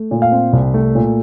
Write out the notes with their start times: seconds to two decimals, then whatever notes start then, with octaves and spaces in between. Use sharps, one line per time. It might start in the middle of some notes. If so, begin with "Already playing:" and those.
Already playing: A3
0.11 A#2
0.22 F5
0.32 C4
0.53 C2
0.74 A3
0.95 A#2